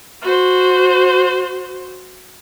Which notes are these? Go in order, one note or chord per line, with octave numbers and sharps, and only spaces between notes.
F#4 C5